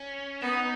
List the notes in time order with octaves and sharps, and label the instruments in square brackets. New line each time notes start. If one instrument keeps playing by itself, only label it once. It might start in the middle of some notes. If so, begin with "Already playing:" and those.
Already playing: [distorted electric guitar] C#4
[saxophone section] B3 [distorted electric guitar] D#4